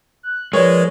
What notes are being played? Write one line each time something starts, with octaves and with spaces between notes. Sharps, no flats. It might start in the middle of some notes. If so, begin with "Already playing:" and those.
F#6
F3 G#3 A#4 B4 C#5 D5